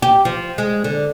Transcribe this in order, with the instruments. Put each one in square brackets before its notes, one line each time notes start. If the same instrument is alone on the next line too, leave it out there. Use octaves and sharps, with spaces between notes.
[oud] G4
F3
G#3
D3